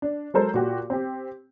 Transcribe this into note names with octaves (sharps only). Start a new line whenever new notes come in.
D4
F#3 G#3 A4 A#4 C5
A#2 F#4 G4
C4 G4